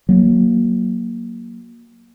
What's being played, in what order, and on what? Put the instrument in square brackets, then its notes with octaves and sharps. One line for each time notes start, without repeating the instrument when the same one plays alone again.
[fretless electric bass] F#3 A#3